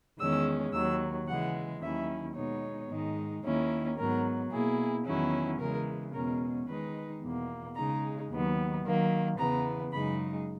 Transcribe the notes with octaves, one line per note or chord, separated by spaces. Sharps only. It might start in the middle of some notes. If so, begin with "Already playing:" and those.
E2 D#3 G#3 C#4 E6
D#2 D#3 F#3 E6
C#3 E3 G#3 F#5
D#2 D#3 F#3 C#4 E4 E5
B2 G#3 B3 D#4 C#5
G#2 D#3 G#3 D#4
D#2 D#3 A#3 C#4 E4
G#2 F#3 B3 A#4
B2 A#3 E4 G#4
E2 D#3 F#3 C#4 E4
C#3 E3 G#3 A#4
E2 B2 G#3 C#4 A#4
D#3 G#3 D#4 B4
E2 B2 A#3
C#3 G#3 D#4 A#5
D#2 D#3 F#3 B3
D#3 F#3 A#3
E2 C#3 E3 B3 A#5
F#2 C#3 G#3 D#4 B5